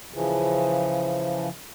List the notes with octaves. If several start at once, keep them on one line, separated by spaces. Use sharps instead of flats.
C#3 E3 F3